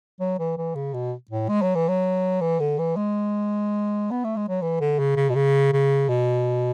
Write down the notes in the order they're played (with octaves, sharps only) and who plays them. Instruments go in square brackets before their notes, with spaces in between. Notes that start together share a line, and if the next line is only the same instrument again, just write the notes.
[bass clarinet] F#3
E3
E3
C#3
B2
A2
G#3
F#3
E3
F#3
E3
D3
E3
G#3
B3
A3
G#3
F#3
E3
D3
C#3
C#3
B2
C#3
C#3
B2